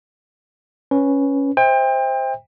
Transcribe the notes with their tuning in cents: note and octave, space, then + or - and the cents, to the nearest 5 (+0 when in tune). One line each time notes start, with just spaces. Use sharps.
C#4 +0 B4 +0
C5 +0 E5 -45 G5 +30